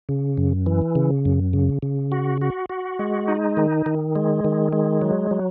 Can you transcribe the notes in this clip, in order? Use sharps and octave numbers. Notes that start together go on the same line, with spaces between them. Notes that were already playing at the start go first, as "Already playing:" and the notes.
C#3
F#2
E3
C#3
F#2
C#3
C#3
F#4
F#4
F#4
G#3
D#4
D#3
D#3
G#3
D#3
G#3
F#3
F#3